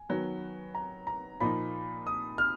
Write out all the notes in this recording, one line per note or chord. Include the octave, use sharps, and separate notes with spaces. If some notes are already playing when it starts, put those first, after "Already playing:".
Already playing: G#5
D#3 F#3 B3
A#5
A#5
A#2 F3 A#3 D#4 B5
D#6
F6